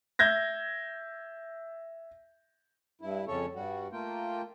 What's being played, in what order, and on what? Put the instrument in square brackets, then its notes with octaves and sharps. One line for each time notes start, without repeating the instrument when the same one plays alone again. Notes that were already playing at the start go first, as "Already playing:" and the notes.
[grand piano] E5 G6 G#6 A#6
[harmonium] G2 E4
F2 C#3 C#4 A4 C#5
G2 G3 F#4
A3 A#3 F4 G5